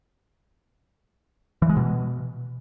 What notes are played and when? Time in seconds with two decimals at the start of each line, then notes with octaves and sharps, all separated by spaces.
1.62 E3
1.69 G#3
1.77 B2